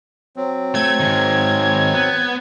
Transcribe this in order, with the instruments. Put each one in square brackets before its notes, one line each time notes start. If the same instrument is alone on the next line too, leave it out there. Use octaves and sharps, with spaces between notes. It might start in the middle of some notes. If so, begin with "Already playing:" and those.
[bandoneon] F#3 C4
[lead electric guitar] A3 [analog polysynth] G#6
[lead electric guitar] G#2 D#3
B3